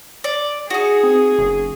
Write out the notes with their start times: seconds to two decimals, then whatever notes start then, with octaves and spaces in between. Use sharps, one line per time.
0.24 D5
0.70 D#4 F#4 G#4
1.03 C4
1.39 F#1